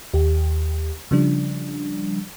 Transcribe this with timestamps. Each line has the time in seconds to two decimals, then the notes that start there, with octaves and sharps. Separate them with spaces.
0.14 D#2 G4
1.11 C#3 F3 G3 D4